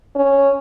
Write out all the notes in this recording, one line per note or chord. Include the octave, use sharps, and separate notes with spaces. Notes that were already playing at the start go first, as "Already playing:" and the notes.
C#4